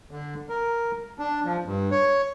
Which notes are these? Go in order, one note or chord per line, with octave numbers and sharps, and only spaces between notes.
D3
A#4
D4
F3
G2
C#5